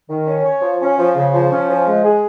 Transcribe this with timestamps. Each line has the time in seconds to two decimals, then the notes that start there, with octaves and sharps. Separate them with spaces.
0.09 D#3
0.27 C#4
0.44 C#5
0.62 F3
0.80 C#4
0.98 F3
1.16 C#3
1.33 F3
1.51 C#4
1.69 F3
1.87 G#3
2.05 G#4